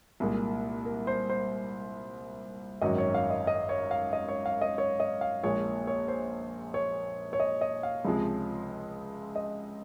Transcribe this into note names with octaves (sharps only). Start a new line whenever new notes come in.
C2 A#2 G#3
A#4
C5
C5
G#1 F#2 D#3 F#3 D#5
C#5
F5
D#5
D#5
C#5
F5
D#5
C#5
F5
D#5
C#5
D#5
F5
A#1 A#2 F3 G#3 C#5
C#5
C5
C#5
C#5
D#5
D#5
F5
C#2 C3 F3 G#3
D#5